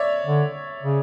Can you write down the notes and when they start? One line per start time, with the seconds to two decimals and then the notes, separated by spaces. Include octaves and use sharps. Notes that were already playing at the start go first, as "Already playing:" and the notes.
Already playing: C#5 D5 E5
0.26 D3
0.83 C#3